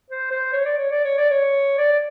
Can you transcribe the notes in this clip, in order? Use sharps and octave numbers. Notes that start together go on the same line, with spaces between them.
C5
C5
C#5
D5
C#5
D5
C#5
D5
C#5
D5